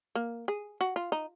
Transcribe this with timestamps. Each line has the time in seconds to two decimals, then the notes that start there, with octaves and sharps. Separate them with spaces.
0.15 A#3
0.48 G#4
0.81 F#4
0.96 F4
1.12 D#4